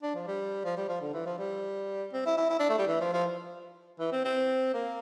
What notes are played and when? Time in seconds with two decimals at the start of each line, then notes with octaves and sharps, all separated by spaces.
0.02 D4
0.15 F3
0.27 G3
0.64 F3
0.77 G3
0.88 F3
1.01 D3
1.13 E3
1.26 F3
1.38 G3
2.13 C4
2.26 E4
2.37 E4
2.50 E4
2.59 D4
2.69 A3
2.78 G3
2.87 E3
3.00 F3
3.13 F3
3.99 E3
4.12 C4
4.24 C4
4.74 A#3